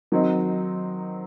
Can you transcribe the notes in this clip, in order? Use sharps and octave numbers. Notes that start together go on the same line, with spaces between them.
D#3 F#3 C4 D#4